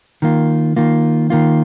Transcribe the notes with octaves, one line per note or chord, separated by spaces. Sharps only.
D#3 A#3 F4
D#3 A#3 F4
D#3 A#3 F4